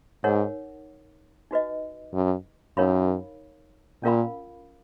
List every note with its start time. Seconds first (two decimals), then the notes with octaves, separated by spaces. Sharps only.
0.24 G#2 D#4 A#4 C#5 F#5
1.51 D#4 F#4 B4 D#5
2.14 F#2
2.77 F#2 D#4 A#4 C#5 F5 B5
4.03 A#2 C#4 F4 A#4 F5 B5